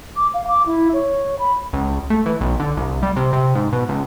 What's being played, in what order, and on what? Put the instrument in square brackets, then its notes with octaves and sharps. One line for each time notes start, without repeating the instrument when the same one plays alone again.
[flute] D6
F5
D6
E4
C#5
B5
[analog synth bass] C#2
A3
E3
B1
D3
C2
G3
C3
C3
G#2
B2
C#2